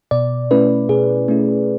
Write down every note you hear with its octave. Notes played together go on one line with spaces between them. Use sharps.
B2 D5
A3 C#4 E4 B4
B2 G#4
A3 C#4 E4